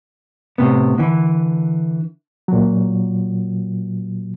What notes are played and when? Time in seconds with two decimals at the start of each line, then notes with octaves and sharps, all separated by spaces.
0.58 A2 C3 B3
0.98 D3 E3
2.48 A#2 F#3